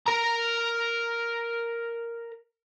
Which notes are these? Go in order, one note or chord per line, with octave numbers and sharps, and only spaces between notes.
A#4 A#5